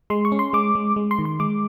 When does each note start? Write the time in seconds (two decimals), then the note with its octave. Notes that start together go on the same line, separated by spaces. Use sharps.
0.10 G#3 C6
0.25 C#6
0.32 C#4
0.39 C6
0.53 G#3 D6
0.75 G#3
0.96 G#3
1.11 C6
1.19 D#3
1.25 C6
1.40 G#3 D6